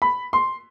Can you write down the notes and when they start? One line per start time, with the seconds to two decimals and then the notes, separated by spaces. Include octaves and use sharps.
0.02 B5
0.33 C6